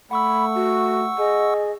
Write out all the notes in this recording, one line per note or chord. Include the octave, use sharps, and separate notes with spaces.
A3 F#5 B5 C#6 E6
F#4
G#4 D#5